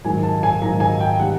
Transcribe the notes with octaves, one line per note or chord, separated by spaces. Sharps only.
G#2 D#3 F#3 G#5
A5
G#5
G#2 D#3 F#3 A#5
G#5
G5
C3 D#3 G3 F#5